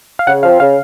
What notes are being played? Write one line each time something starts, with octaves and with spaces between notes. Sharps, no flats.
F5
C#3 F#5
F3 C4 F5
C#3 F5